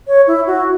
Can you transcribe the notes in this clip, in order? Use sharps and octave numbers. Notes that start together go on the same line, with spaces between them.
C#5
E4
F#4